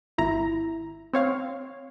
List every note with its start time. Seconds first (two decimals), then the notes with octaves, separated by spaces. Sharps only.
0.18 G#1 E4 A#5
1.13 C4 C#5 F5